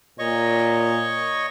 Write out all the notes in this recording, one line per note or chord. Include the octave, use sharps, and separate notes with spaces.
A#2 C#5 D#5 C#6